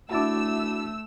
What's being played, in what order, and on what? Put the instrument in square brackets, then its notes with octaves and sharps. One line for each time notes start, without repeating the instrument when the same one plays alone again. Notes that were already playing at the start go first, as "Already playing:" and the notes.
[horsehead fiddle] A3 [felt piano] D4 E4 [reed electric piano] F#4 A5 D6 [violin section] E6